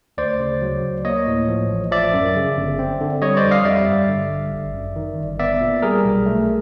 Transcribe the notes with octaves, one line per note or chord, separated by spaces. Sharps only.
D2 C5 D5
C#3
F#3
D2
A#3 C#5 D#5
A2
F3
A1
F3 D5 E5
F#2
C#3
G1
C4
D3
G3 C#5 D#5
C5 D5
F2
D#5 F5
G3 D5 E5
G2
D3
A1
G1
F#2
D#3
G1
B3 D5 E5
A#2
G3 G#4 A#4
B1
A3